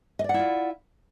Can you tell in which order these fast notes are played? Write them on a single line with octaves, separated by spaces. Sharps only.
D#5 D5 F#5 E4 F4